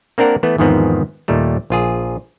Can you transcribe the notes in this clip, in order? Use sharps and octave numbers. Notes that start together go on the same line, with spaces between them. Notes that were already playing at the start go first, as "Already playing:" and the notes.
A#3 C4 D4 A#4 F#5
E3 A3 B3
E2 G#2 D#3 F3 B3 C4
D#2 A#2 G3 A3
A#1 F4 G#4